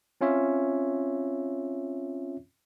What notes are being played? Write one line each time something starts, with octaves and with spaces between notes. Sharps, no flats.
C4 C#4 F4 C#5 E5